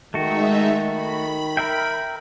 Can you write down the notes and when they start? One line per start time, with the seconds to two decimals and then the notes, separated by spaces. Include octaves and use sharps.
0.14 D#3 G#3 A3 D#4 F#4 E5
0.88 B5
1.57 A#4 E5 G5